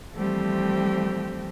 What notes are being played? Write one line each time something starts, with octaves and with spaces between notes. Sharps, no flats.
E3 F3 G3 A3 C4 G4